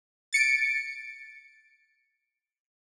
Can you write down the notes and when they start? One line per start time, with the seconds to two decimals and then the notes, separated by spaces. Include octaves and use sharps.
0.33 A6 C#7 D7